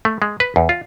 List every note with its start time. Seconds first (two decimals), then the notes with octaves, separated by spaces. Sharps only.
0.05 A3
0.22 G#3
0.40 B4
0.56 E2
0.69 F4